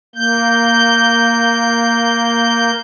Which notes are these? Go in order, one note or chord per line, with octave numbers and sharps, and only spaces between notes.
A#3 G6